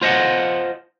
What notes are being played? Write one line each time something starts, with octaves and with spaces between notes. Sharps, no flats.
F4 C5 D#5 E5 F#5